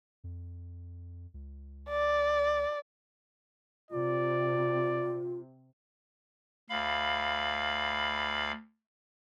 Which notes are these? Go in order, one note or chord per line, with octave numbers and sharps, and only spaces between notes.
F2
C#2
D5
C3 F4 D5
D2 F5 B5